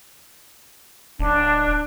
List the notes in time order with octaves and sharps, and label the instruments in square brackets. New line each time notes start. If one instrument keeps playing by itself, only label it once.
[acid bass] D1 [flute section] D4